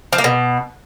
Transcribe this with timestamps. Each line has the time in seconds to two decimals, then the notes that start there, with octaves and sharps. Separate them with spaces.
0.13 F3
0.18 A#3
0.24 B2